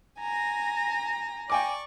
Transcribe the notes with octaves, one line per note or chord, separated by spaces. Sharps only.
G#5 A#5 A#6
D5 G5 G#5 C#6 D6